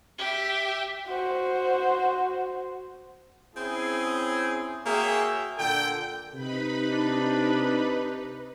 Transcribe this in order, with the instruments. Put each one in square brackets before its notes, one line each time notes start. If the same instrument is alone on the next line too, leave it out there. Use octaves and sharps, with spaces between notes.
[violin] G4 E5
[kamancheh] F#4 C5
[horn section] C4 C#4 E4 G#4
A#3 F#4 G#4 C#5 E5 G5
A#2 D3 A4 G5
[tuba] C3 [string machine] D#4 B4 B5
[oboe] D4